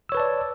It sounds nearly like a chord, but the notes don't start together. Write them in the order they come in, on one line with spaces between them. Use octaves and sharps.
E6 C#5 B4 A5 D5